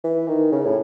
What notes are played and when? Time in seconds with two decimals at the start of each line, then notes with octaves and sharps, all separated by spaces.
0.04 E3
0.28 D#3
0.52 C#3
0.66 A2